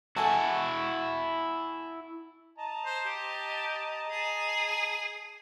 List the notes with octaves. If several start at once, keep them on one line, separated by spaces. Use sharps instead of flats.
E4 F#4 A4 G#5 A5
D#5 A5 A#5
C5
G4
G#4